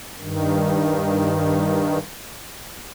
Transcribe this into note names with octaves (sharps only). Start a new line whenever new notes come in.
G2 D#3